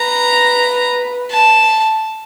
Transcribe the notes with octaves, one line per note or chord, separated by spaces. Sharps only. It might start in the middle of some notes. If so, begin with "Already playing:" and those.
Already playing: B4 A#5
A5